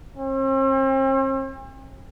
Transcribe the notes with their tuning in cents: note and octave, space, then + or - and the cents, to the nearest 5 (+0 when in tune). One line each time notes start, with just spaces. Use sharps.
C4 +45